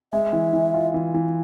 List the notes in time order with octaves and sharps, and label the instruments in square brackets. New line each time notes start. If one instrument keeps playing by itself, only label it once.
[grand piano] G#3 [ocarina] E5
[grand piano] E3
E3
F4
E3
E3